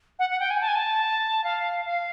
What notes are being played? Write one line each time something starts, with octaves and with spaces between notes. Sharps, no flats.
F#5
F#5
G5
G#5
A5
G#5
A5
F5
F5